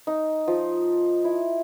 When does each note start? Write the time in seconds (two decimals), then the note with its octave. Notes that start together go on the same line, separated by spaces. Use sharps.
0.07 D#4
0.48 F3
1.24 E4